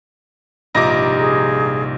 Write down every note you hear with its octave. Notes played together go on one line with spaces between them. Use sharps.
A#1 G#2 C3 G3 D#4 F4 A#5 D6
G#4